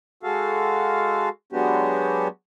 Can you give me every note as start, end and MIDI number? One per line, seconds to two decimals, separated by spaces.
0.23 1.29 56
0.23 1.29 66
0.23 1.29 69
0.23 1.29 77
1.53 2.28 54
1.53 2.28 56
1.53 2.28 59
1.53 2.28 62
1.53 2.28 66
1.53 2.28 67